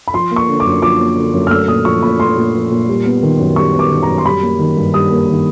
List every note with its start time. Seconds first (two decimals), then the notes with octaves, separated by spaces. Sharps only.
0.08 B5
0.14 F3 C6
0.31 A#3
0.36 C#6
0.48 D3
0.60 D6
0.65 F#2
0.82 F3 D6
1.00 A#3
1.17 D3
1.34 F#2
1.47 F6
1.51 A3 E6
1.68 A#2 D#6
1.85 F3 C#6
2.03 A#2 B5
2.20 A3 C6
2.37 A#2
2.54 F3
2.71 A#2
2.88 G3
3.05 B3
3.23 D#3
3.39 F#2
3.56 G3 C#6
3.74 B3
3.79 D6
3.91 D#3
4.03 A#5
4.08 F#2
4.18 C6
4.25 G3 B5
4.43 A#3
4.59 D#3
4.77 G2
4.94 G3 D#6
5.11 A#3
5.29 D#3